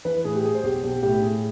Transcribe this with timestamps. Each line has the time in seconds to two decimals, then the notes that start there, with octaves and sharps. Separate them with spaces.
0.05 E3 B4
0.24 A2 G#4
0.35 G4
0.44 G3 G#4
0.55 C5
0.63 B1 G4
0.83 B1 G4
1.03 A2 G4
1.22 A2 G#4